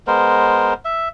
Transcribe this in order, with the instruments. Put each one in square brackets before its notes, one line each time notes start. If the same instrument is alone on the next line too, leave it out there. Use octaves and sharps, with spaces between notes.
[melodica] G#3 B3 A#4 C5
E5